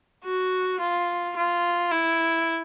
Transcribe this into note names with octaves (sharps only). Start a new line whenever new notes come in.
F#4
F4
F4
E4